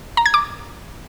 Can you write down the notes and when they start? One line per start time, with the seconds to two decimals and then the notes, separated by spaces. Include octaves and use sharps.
0.17 A#5
0.26 G#6
0.34 D6